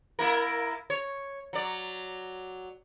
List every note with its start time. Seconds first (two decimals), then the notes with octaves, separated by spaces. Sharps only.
0.19 A#3 E4 A#4
0.90 C#5
1.53 F#3 D5